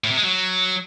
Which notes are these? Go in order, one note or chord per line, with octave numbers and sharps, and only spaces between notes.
A2
C3
G#3
F#3